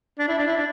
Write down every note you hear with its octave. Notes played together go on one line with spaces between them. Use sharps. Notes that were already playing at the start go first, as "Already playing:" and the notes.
D4
E4
D4
E4
D4